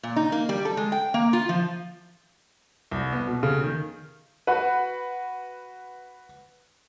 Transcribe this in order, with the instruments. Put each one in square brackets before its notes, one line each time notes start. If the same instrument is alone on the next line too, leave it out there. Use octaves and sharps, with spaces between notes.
[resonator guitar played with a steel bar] A#2
D#4
A#3
G3
A4
G#3
G5
A#3
F4
F3
[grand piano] C2
B3
B2
C#3
D#3
[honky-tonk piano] F#4 B4